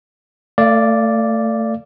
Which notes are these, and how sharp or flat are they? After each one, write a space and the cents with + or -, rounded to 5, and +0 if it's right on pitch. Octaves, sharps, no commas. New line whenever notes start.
A3 +25 D5 +0 F5 -25